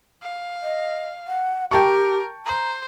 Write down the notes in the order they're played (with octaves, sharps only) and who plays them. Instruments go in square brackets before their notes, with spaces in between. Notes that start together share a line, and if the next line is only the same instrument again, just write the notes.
[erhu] F5
[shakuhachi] D#5
F#5
[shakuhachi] G4 [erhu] A#4 [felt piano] G5 A5 C#6
[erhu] C5 [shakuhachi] A#5